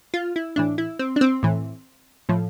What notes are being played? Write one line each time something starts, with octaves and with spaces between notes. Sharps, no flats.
F4
E4
A2 E3 D4
E4
C4
D4
C4
A2 E3
A2 F3